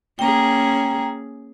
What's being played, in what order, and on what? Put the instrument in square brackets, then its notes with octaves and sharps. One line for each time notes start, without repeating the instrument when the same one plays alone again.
[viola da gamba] A#3 C#4 G#4 [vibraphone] G5 A#5